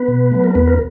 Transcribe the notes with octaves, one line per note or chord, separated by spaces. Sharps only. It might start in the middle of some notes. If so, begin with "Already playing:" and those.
Already playing: B3 B4
B2
F#3 A3
A#4
E2 B3 B4
A#4